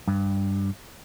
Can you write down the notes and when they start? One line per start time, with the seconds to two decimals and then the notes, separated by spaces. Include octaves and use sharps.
0.08 G2